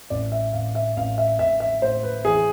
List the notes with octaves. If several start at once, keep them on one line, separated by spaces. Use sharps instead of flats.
A1 D5
E5
A1 F5
E5
A1 F5
E5
A1 E5
E5
A2 C5
B4
E3 G#4